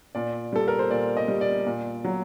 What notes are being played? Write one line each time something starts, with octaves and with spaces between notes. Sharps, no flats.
A#2 D5
G3 A4
A#4
C5
A#2 D5
D#5
G3
D5
A#2
F#3